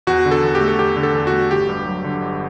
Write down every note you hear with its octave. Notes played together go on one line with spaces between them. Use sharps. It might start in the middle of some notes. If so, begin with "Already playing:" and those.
E2 F#4
D3
A4
E2
G4
A3
A4
E2 G4
D3
A4
E2
F#4
A3
G1 G4
G2
F#3
D3
G1